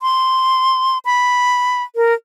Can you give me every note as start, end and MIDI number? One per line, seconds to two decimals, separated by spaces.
0.02 0.98 84
1.05 1.83 83
1.96 2.13 70